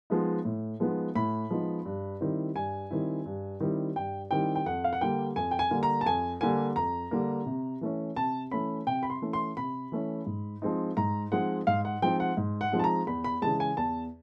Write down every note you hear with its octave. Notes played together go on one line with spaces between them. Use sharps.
F3 G#3 B3 D#4
A2
F3 G#3 B3 D#4
A2 B5
F3 G#3 B3 D#4
G2
D#3 G3 C4 E4
G2 G#5
D#3 G3 C4 E4
G2
D#3 G3 C4 E4
G2 G5
D#3 G3 C4 E4 G5
G5
F2 F#5
F5
F#5
D3 G3 A#3 G5
F2 G#5
G5
G#5
D3 G3 A#3
A#5
A5
F2 G#5
D3 G3 A#3 G#5
F2 A#5
D3 G3 A#3
C3
E3 A3 C#4
C3 A5
E3 A3 C#4 B5
C3 G5
B5
C6
E3 A3 C#4
C6
C3 B5
E3 A3 C#4
G#2
F3 G#3 C4 D#4
G#2 A#5
F3 G#3 C4 D#4 F#5
G#2 F5
F#5
F3 G#3 C4 D#4 G5
F#5
G#2
F#5
F3 G#3 C4 D#4
A5
A#5
E2 B5
B5
C#3 E3 G#3 A5
G#5
E2 A5